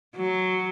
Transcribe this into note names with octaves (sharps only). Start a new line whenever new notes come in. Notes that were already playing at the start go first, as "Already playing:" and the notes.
F#3